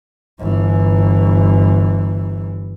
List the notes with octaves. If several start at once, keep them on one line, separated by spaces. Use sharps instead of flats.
G1 E3